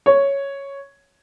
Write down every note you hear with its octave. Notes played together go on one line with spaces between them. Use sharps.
C#5